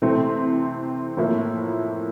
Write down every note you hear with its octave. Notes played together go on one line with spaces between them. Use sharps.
C3 E3 A3 C4
A2 F3 A#3 E4